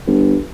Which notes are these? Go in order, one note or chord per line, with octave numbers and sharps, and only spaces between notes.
G1